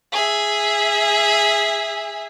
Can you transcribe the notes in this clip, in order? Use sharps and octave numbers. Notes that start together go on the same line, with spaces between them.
G#4 E5